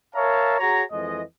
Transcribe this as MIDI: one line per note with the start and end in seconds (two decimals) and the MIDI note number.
0.16 0.59 70
0.16 0.59 73
0.16 0.59 76
0.16 0.59 77
0.16 0.59 81
0.16 0.59 82
0.60 0.84 66
0.60 0.84 68
0.60 0.84 73
0.60 0.84 82
0.92 1.22 41
0.92 1.22 52
0.92 1.22 56
0.92 1.22 75